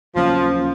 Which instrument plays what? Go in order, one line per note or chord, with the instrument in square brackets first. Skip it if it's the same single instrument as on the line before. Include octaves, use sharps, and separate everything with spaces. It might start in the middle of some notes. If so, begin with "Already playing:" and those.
[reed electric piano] D#2 C#3 F#3 A#3 C#4 [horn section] F3